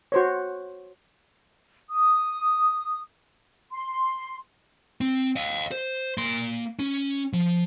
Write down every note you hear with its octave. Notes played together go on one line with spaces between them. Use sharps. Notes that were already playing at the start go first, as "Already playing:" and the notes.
F#4 C5 C#5
D#6
C6
C4
D#5 F5
C5
A#3 C6
C#4
F3